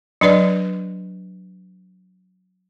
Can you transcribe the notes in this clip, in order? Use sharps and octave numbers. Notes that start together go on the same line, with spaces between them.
F#3 D4 B4 D5